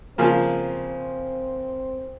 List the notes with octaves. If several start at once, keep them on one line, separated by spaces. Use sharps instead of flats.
C#3 F3 A#3 C4